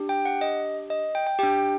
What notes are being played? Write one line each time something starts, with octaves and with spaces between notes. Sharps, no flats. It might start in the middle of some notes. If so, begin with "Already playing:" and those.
Already playing: D4 G4
G5
F#5
D#5
D#5
G5
G5
D4 G4 G5